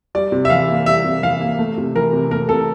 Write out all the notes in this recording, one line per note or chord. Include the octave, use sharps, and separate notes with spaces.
G3 D5
C3
E5
E3 F5
A#3
G3 E5
C3
E3 F5
A#3
A3
C3
E3 A#4
C3
A3 A#4
C3 A4